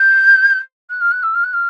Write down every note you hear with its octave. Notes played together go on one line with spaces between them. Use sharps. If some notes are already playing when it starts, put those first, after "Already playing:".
Already playing: G6
F#6
F6
F#6
E6
F6
F#6
F6